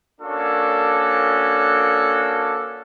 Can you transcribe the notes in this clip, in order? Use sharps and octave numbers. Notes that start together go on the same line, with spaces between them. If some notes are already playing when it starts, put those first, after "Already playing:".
A#3 C#4 D4 F#4 A4